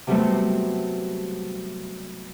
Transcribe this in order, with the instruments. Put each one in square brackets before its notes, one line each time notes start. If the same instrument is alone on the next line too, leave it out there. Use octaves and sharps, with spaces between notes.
[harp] C3 F#3 G3 A3 B3 C4